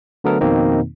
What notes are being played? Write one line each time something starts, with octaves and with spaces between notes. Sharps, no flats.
D3 F#3 A3 B3 A4 A#4
F2 B2 D#3 A#3 C4 D#4